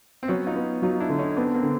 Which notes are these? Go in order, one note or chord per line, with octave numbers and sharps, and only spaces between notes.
C4
F#3 B3 C#4
D#4 F4
B3
F#3 D#4 F4
D4 E4
D3
C#4 D#4
B3 C4 D4
A#3 C4
D3